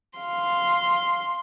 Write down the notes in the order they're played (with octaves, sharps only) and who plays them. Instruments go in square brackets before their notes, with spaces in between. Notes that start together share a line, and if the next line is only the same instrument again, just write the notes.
[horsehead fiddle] F5 [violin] C6